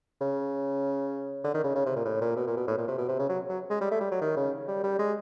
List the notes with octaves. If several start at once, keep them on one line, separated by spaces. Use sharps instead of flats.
C#3
D3
D#3
C#3
C#3
C3
A#2
A2
A#2
B2
A#2
B2
A2
A#2
C3
B2
C3
C#3
F#3
F#3
G#3
G3
A3
G3
F#3
D#3
C#3
G3
G3
G#3